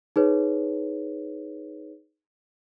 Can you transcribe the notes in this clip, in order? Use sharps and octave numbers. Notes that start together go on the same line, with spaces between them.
D#4 G#4 B4 C#5